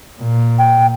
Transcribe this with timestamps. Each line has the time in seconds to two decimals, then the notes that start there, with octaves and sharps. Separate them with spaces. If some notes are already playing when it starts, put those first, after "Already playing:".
0.21 A#2
0.59 G5